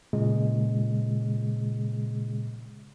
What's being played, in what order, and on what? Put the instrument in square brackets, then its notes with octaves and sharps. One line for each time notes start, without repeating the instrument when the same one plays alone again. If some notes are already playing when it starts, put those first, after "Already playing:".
[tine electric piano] A#2 C#3 G#3